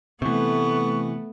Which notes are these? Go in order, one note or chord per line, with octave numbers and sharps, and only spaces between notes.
C3 E3 A3 B3 C#6